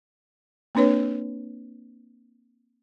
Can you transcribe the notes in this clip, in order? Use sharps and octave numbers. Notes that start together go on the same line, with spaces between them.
A#3 C4 D4 B4 C#5